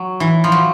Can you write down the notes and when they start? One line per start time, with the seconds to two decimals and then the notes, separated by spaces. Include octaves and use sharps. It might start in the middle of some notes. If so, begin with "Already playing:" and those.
Already playing: F#3
0.20 E3
0.44 F3
0.52 F#3